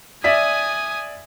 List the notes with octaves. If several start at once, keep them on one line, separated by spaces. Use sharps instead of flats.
D5 E5 G#5 D#6 B6